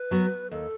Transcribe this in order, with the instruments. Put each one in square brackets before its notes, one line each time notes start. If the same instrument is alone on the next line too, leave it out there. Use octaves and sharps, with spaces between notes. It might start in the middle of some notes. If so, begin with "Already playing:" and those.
Already playing: [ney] B4
[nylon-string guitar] F#3 B3 F#4
[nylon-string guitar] D#2 [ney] A4